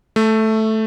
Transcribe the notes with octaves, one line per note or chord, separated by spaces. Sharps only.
A3